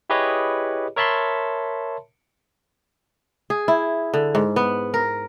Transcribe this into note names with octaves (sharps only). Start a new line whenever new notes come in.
E4 G4 G#4 B4 C#5 D#5
A#4 C#5 E5 A5 B5 C6
G#4
E4
D3
G#2
B3
A#4